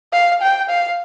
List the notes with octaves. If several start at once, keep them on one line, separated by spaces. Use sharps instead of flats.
F5
G5
F5